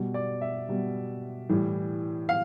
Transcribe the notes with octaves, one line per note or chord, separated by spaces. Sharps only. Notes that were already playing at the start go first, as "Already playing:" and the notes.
Already playing: B2 G3
D5
E5
B2 G3
A2 E3 G3
F5